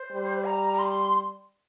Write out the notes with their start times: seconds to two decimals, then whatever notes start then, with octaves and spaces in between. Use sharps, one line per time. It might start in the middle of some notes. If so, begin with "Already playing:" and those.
Already playing: C5
0.12 G3
0.45 A#5
0.73 A#5
0.79 C6